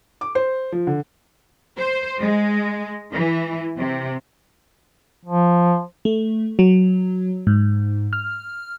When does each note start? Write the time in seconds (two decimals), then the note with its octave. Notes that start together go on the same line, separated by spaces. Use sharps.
0.21 D6
0.35 C5
0.72 F3
0.87 D3
1.78 C5
2.21 G#3
3.14 E3
3.78 C3
5.25 F3
6.05 A3
6.59 F#3
7.47 G#2
8.13 F6